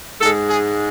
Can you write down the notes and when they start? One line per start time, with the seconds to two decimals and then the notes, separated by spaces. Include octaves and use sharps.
0.20 G#2 A4
0.25 G#3
0.48 G#4